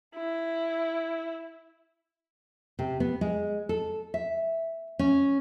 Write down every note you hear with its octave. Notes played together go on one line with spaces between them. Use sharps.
E4
C3
B3
G#3
A4
E5
C#4